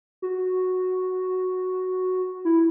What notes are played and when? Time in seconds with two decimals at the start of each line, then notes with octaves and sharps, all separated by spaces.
0.22 F#4
2.45 E4